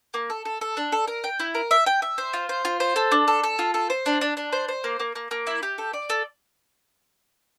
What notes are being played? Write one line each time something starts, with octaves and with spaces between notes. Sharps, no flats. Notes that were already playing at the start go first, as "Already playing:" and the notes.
A#3
A4
A4
A4
D4
A4
A#4
G5
E4
A#4
E5
G5
E5
C5
F4
C5
F4
C5
A4
D4
A4
A4
F4
A4
C5
D4
D4
D4
C5
C5
A#3
A#3
A#3
A#3
E4
G4
A4
D5
A4